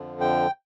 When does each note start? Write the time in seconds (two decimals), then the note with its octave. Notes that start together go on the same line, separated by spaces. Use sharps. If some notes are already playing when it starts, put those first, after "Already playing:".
Already playing: F2 D3 F3
0.21 G5